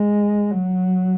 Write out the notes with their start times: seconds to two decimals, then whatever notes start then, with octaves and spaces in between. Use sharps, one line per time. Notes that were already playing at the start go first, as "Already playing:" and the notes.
Already playing: G#3
0.51 F#3